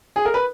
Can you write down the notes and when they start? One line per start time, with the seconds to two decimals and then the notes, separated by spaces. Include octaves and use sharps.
0.16 G#4
0.25 A#4
0.34 B4